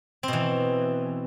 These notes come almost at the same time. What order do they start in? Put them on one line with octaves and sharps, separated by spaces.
C4 B2 E3